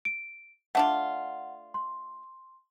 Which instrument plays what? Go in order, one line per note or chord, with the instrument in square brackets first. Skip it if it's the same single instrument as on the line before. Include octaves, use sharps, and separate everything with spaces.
[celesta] D7
[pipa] A3 D4 F4 [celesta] F#5
[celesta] C6